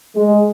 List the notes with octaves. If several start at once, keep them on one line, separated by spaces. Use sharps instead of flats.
G#3